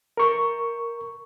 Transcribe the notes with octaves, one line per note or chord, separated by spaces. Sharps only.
A#4 C#6